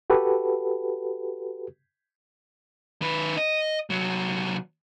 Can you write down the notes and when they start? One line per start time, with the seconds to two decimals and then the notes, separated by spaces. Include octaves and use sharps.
0.10 F#4 G4 A4 B4
3.02 D#3 B4
3.37 D#5
3.90 C2 F#3